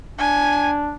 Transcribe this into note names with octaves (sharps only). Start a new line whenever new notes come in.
D4 G#5